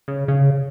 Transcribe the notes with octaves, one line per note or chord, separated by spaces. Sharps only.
C#3
C#3